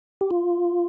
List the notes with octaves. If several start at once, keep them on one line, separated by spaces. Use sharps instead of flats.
G4
F4